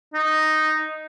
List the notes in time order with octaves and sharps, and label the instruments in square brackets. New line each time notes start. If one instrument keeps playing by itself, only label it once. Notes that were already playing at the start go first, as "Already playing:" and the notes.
[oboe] D#4